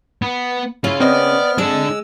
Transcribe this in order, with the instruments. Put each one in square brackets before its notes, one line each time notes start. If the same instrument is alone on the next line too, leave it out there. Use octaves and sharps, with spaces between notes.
[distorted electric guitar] B3
[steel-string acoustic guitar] C#3 C#4 [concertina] E4 [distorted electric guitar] F4 F5
[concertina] B3 F6 [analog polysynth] C4 D#5 [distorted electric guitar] D5
[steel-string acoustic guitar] G#3 [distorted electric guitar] D4 A4 [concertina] E6